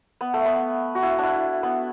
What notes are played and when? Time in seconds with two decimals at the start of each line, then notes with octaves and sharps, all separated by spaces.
0.21 B3
0.34 A3
0.46 B3
0.95 F#4
1.03 E4
1.18 D4 E4
1.63 B3